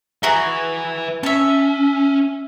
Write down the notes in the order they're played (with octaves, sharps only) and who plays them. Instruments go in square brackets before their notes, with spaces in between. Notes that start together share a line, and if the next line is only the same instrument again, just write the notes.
[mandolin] F#4 G#4 A#5 [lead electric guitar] B4 E5
[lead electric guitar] C#4 [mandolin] E5 A5